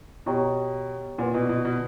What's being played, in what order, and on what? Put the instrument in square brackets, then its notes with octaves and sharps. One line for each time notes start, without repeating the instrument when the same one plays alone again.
[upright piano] B2 [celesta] G4 C#5 G5 A#5 C#6
[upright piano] A#2 [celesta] B4 D5 F#5
[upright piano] B2
B2
B2